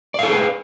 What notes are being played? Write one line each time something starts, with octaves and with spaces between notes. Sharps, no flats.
G#4 A4 B4 D5 F5